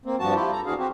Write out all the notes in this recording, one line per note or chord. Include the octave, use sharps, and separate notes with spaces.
A#3 C4
G2 F3 F#4 A5
E4 F4 G4
A4 A#5
E2 E3 D4 F#4 G#4 F5
C4 F#4 G4